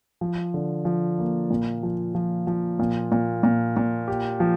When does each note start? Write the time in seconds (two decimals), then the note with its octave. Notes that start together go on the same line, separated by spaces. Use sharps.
0.21 F3
0.54 D3
0.85 F3
1.18 A#3
1.50 A#2
1.83 F3
2.15 F3
2.47 F3
2.79 A#2
3.12 A#2
3.43 A#2
3.77 A#2
4.08 G4
4.40 F3